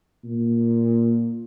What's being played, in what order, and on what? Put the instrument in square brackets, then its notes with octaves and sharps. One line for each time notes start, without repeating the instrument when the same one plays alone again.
[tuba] A#2